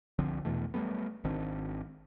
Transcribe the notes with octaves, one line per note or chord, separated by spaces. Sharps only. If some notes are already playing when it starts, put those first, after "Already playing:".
C2 D3 F3 C4
E2 B2 E3 A3
F#3 G3 A3 B3
G#1 D#3 C4 D4